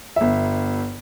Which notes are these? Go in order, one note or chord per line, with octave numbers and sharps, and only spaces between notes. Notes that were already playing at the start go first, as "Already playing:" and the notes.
G1 E5